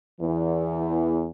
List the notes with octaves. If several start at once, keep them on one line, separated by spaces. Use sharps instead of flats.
E2 E3